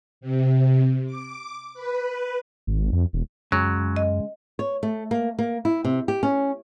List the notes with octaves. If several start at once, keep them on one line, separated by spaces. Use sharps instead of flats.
C3
D6
B4
G#1
F2
E1
F#2 C#3 F#3 G#3
D#5
C#5
A3
A#3
A#3
E4
C3
G4
C#4